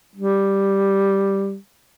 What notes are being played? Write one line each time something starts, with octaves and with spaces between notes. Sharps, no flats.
G3